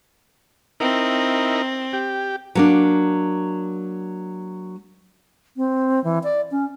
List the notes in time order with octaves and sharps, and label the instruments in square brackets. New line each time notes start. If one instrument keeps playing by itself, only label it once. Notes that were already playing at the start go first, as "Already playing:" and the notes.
[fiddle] C4 [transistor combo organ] D#4 E4 A#4
[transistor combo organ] G4
[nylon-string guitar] F#3 A#3 D4
[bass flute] C4
E3
D5
C#4